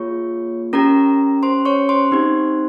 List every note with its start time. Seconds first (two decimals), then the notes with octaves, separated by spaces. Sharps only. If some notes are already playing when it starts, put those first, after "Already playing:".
Already playing: A#3 F4 G#4 C#5 C#6
0.73 C#4 G4 A#4 A#5
1.43 C5 C6
1.65 C#5 C#6
1.89 C5 C6
2.11 C4 D#4 G4